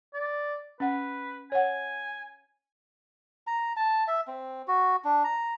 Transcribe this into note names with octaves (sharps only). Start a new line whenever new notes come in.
D5
C#4 B4 F#5
C#5 F#5 G#5
A#5
A5
E5
C4
F#4
D4
A#5